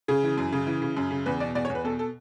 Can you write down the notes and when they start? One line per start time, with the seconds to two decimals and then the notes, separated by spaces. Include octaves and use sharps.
0.08 C#3 G#4
0.23 E3
0.38 F#2
0.53 C#3
0.67 E3
0.82 C#3
0.97 F#2
1.11 C#3
1.26 E2 B4
1.40 B2 D5
1.55 E2 D5
1.65 C#5
1.70 E2
1.75 B4
1.84 B2 A4
1.99 A4